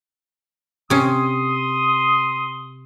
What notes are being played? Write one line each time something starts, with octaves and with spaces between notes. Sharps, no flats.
C3 C#4 C6 D#6